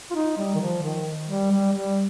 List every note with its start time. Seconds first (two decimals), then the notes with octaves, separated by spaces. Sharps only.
0.11 F4
0.15 D#4
0.37 G3
0.55 D#3
0.61 F3
0.83 D#3
1.29 G3
1.51 G3
1.73 G3